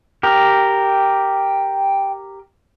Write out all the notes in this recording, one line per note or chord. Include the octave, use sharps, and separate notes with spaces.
G4 A#4 G5